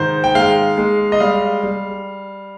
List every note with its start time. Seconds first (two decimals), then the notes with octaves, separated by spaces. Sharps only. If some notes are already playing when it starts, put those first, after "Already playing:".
Already playing: G#2 D#3 C5
0.24 G5
0.35 G#3 F5
0.78 G#3
1.12 D#5
1.20 G3 F5
1.63 G3